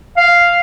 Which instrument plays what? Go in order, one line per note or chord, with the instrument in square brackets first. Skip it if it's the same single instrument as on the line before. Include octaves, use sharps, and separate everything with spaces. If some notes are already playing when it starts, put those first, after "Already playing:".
[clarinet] F5